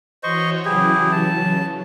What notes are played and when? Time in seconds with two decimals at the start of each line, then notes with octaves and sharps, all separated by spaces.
0.23 E3 F#4 C5 C#5 D#5 C#6
0.65 C#3 E3 F#3 E4 G4 G#4
1.12 A5